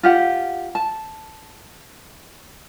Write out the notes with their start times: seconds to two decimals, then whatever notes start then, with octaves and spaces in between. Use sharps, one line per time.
0.03 F4 G4 F#5
0.75 A5